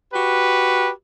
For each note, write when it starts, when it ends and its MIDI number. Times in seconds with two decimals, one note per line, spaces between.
0.14 0.89 66
0.14 0.89 67
0.14 0.89 71